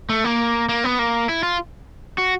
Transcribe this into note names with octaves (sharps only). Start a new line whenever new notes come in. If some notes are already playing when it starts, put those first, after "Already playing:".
A3
A#3
A#3
B3
A#3
E4
F4
F#4